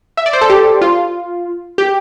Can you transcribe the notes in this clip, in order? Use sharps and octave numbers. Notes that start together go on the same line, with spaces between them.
E5
D5
C5
A4
G4
F4
G4